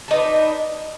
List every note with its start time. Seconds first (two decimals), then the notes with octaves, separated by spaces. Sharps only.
0.08 A4
0.11 D#4
0.13 B4
0.16 D4